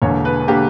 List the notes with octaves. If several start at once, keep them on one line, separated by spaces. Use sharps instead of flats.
E1 E2 D3 A#3 C#5
B4
D3 A#3 G4